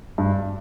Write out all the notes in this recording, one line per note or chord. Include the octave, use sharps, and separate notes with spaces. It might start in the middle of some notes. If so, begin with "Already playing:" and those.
G2